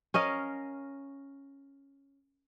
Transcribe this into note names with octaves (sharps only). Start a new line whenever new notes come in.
C#4 A#4 D#5 F5